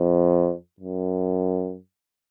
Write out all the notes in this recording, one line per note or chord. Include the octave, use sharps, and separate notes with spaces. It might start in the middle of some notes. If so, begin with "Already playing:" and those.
Already playing: F2
F#2